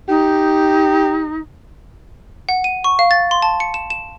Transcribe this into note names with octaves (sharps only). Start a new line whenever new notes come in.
D#4 G4
F#5
D#7
C#6
F5
A6
C6
A5
C#7
E7
E7